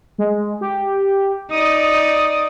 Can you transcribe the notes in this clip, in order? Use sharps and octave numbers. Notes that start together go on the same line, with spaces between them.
G#3
G4
D#4 D5 D#6